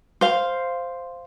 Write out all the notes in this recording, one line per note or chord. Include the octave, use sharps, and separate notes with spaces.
C5 F5